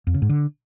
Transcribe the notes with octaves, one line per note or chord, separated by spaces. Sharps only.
F2
C#3
G#2
D3